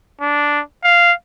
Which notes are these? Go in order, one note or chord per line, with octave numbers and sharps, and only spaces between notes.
D4
F5